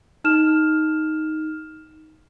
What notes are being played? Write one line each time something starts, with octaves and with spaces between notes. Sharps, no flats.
D#4 F6 E7